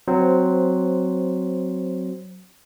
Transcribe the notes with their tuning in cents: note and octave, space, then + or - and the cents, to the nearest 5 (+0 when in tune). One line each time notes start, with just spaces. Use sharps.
F#3 +0 C4 -10 C5 +0